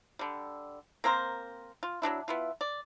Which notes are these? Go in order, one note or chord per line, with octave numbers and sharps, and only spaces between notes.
D3 G3
A#3 C4 A#4 C5
F4
F#3 C4 D4 E4
B3 E4 F4
D5